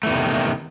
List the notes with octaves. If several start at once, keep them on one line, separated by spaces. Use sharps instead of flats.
E2 C3 D#3 E3 A3